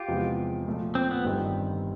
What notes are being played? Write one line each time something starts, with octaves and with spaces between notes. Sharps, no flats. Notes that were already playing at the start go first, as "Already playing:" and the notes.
Already playing: F4 G4
E2 C3 F3 G#3
A#2 F3 A3
C4
B3
G1 G2 D#3 G3 C4